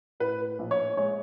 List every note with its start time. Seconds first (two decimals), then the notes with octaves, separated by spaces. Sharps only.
0.20 A2 B4
0.59 A#1
0.71 C#5
0.97 G#3 C#5